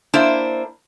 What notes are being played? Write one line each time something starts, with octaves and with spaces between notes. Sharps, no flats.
A#3 D4 E4 C5